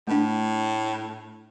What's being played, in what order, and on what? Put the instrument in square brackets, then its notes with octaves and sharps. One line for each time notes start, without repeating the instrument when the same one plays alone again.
[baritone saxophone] A2 [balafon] A3 D4